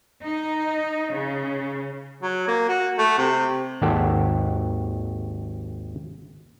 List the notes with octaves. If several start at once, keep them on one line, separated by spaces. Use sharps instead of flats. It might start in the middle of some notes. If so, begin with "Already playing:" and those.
D#4
C#3
F#3
A#3
F#4
A3
C3
G#1 D#2 G4 A4 F#5